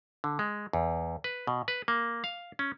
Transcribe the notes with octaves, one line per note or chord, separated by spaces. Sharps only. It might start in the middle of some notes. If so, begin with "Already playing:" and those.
D3
G#3
E2
B4
B2
B4
A#3
F5
C#4